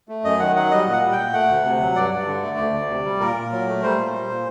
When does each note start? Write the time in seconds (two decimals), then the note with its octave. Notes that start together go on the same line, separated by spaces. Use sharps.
0.09 A3
0.24 F#2 D#5
0.40 D#3 F#5
0.55 F#3 F#5
0.71 G3 D#5
0.86 A#2
0.92 F#5
1.02 G3
1.12 G5
1.18 A#2
1.33 A3 F#5
1.49 D2
1.64 C3
1.81 F#3
1.96 G2 D5
2.11 G2
2.27 D3
2.43 A3
2.57 D2
2.74 D2
2.90 C3
3.05 G3
3.20 A#2 A#4
3.35 A#2
3.51 F#3
3.67 A3
3.83 G3 C5
3.98 A#2
4.13 G3
4.29 A#2